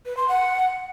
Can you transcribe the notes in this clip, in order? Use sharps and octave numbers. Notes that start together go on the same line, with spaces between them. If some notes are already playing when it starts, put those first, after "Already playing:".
B4
C6
F#5